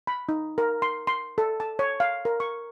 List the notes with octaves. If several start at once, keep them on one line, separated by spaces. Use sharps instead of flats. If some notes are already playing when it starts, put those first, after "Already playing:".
B5
D#4
A#4
C6
C6
A4
A5
C#5
F5
A#4
C#6